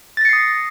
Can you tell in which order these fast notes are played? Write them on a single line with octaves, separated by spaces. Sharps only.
A6 A#6 C#7 C7 D#6